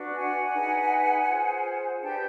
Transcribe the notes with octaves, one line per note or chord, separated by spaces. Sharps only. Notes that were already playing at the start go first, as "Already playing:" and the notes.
Already playing: D4 F#4 B4
F#5 G#5
D#4 G#4 B4
F4 G#4 C5
D4 G4 B4 G5 A5